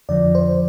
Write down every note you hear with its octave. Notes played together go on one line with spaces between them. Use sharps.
F2 D3 F3 D5
C5